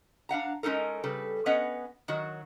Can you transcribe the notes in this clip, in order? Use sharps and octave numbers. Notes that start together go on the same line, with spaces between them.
D4 F5 F#5 A#5
G#3 C#4 D#4 A4 A#4
C#3 G3 A4 B4
B3 C#4 B4 D#5 F#5
D#3 F#3 F#4